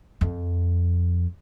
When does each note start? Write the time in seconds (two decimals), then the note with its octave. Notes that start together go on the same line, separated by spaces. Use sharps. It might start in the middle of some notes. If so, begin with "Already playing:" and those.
0.21 F2